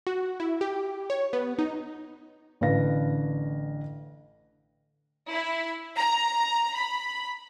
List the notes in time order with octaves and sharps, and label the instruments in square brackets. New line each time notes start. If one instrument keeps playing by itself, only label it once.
[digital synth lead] F#4
E4
G4
C#5
B3
D#4
[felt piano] A1 D3 B4 F5 A#6
[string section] E4
A#5
B5